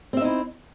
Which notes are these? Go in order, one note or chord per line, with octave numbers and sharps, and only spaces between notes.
C4 D#4 E4 E5